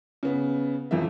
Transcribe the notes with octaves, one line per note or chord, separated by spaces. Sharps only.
C#3 B3
D#1 F2 E3 F3 E5